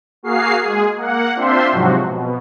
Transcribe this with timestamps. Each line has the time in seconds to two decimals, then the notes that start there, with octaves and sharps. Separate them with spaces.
0.23 A#3 F#4 G#4 F5 C7
0.61 G#3 G#4
0.96 A#3 F#5
1.35 C4 D4 F4 C5 E5 C6
1.71 G#2 C3 F3 F#3 F#4
2.06 B2